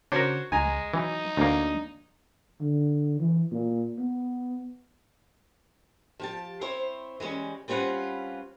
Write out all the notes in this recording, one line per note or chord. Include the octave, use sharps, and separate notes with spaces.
C#3 D4 F#4 A#4 C5 C#5
C#2 G#3 G#5 A#5
E3 F#3 D#4
D2 A#3 D4
D3
E3
A#2
B3
F3 G4 A5
C4 E4 C5 C#5
E3 G3 G#3 C#4
G3 C4 C#4 F4 B4 F#5